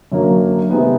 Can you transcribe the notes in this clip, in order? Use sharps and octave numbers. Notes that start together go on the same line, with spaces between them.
F#2 D3 F#3 A#3
C3 D#3 G#3 B3 D#4